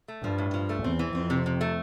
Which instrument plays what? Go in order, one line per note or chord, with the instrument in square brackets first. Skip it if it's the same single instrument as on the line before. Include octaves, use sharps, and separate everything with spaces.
[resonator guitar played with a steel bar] A3
[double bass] G2 [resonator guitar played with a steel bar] F3
[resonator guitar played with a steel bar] A2
F3
A3
[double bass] E2 [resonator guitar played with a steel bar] C4
[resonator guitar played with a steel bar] E3
[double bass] F2 [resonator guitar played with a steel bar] C4
[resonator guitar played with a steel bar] C3
C3
A3